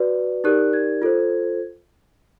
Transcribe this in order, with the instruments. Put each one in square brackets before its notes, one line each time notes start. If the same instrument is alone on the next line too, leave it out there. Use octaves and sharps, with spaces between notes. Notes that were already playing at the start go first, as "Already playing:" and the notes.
Already playing: [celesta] F#4 B4 D5
D#4 G4 A#4 D5 F#6
G#6
F4 A4 C5